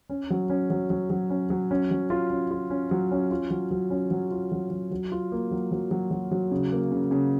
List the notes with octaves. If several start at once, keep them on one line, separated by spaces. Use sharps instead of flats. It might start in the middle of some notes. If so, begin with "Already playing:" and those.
C#4
F#3
C#4
F#3
F#3
F#3
C#4
F#3
C#4
F#3
F4
C#4
F4
C#4
F#3
C#4
F4
F#3
F#3
C#4
F#3
F4
F#3
F#3
F#3
F4
A#3
F#3
F#3
F#3
F#3
F#3
C#3
A#3
C#3
C#3